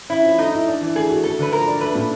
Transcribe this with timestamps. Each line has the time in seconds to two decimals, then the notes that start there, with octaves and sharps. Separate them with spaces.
0.10 C#4 E4
0.24 F3
0.38 A3 D#4
0.53 E4
0.67 D4
0.81 E3
0.95 A3 G#4
1.10 F#4
1.24 A3 A4
1.39 D3 B4
1.52 F3 A#4
1.67 D4
1.81 A3 B4
1.95 A#2